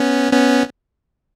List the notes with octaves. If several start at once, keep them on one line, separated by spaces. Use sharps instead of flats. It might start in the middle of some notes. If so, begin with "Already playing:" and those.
Already playing: B3 C#4
B3 C#4